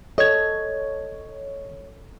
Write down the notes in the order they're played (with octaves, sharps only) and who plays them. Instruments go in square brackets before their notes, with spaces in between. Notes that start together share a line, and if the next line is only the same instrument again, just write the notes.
[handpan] A4 [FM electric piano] C#5 [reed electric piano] D#5 G#6